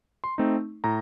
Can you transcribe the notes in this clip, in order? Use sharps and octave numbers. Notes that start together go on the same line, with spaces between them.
C6
A3 C4 D#4
A2 A#5